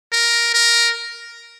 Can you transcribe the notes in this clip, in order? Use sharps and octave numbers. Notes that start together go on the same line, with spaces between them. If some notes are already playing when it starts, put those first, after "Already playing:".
A#4
A#4